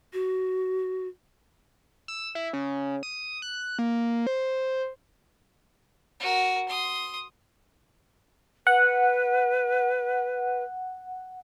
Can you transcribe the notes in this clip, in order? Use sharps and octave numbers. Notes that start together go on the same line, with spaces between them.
F#4
E6
E4
C#3
D#6
F#6
A#3
C5
F#4 A#4
C6 D#6
B4 F#5